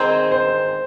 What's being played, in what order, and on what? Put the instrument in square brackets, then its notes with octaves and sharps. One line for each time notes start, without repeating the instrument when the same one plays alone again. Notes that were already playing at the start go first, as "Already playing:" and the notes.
Already playing: [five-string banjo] D#3 C4 G#4 [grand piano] C5
[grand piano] C5